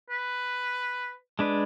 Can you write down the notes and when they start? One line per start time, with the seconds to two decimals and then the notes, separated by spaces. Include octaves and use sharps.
0.10 B4
1.39 G#3 D4 B4